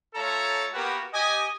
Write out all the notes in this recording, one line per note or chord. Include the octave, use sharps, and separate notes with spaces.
A3 F4 A4 C#5 A5 A#5
A#3 B3 F#4 G4 A#4 B4
G4 D#5 G#5